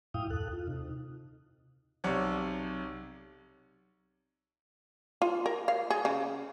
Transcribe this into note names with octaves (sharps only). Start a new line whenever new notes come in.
F#2 A2 E4 F5 G5 D#6
D#2 A4 F#6
F4
C3 D#4
B1 C3 C#5 D5 F#5
F4
A#4
F5
G#4
C#3